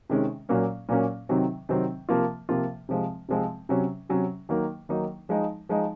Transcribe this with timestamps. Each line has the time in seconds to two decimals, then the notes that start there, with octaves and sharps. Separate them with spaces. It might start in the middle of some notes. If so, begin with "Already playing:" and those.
0.09 C3 D#3 G#3 C#4
0.49 A#2 F#3 A#3 C#4
0.89 A#2 F#3 A#3 C#4
1.29 C3 D#3 F#3 C4
1.69 C3 D#3 F#3 C4
2.09 C3 F3 A#3 F4
2.49 C3 F3 A#3 F4
2.89 C3 F3 G#3 C4
3.29 C3 F3 G#3 C4
3.69 C3 F#3 C#4
4.09 C3 F#3 C#4
4.49 D#3 F#3 A#3 D#4
4.89 D#3 F#3 A#3 D#4
5.29 F3 G#3 D#4
5.69 F3 G#3 D#4